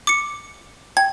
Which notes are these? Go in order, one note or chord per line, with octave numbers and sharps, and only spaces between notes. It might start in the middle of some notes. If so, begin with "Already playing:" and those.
D6 C#7
G5 G#6